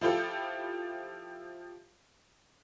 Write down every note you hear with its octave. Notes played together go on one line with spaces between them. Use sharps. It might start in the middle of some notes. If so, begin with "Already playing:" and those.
F3 E4 F4 G4 A4